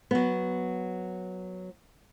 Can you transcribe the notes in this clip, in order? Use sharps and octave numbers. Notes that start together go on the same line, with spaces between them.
F#3 B3